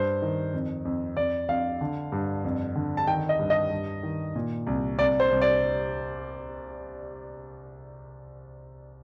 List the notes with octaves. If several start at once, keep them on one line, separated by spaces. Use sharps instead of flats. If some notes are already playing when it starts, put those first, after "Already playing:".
Already playing: G2 C5
D#3
F2
F2
F2 D5
F2 F5
D3
G2
F2
D3
A5
D#3 G5
D#5
G2
D#5
G2
D#3
A#2
C2
C2 D5
C5
C2
D5